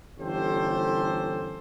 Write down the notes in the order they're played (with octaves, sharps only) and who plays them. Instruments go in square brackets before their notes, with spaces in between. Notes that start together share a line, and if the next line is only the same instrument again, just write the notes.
[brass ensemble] G1 E3 C#4 G4 A4 C5